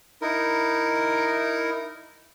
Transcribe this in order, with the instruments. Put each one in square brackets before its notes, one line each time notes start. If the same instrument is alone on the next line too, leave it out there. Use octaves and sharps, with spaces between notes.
[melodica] D#4 E4 A#4